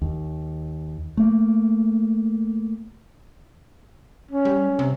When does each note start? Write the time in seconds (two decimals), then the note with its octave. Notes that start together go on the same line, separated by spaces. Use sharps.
0.02 D#2
1.17 A3 A#3
4.32 C#4
4.45 G3
4.79 C3